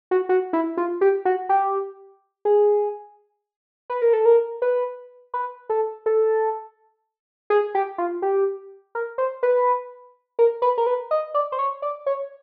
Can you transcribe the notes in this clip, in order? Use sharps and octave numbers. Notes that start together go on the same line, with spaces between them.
F#4
F#4
E4
F4
G4
F#4
G4
G#4
B4
A#4
A4
A#4
B4
B4
A4
A4
G#4
G4
F4
G4
A#4
C5
B4
A#4
B4
A#4
B4
D#5
D5
C5
C#5
D5
C#5